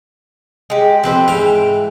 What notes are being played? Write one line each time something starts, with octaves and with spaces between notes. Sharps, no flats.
G#3 G4
F2 C4 G4 B4 C5
G#2 E3 D#4 F5 G5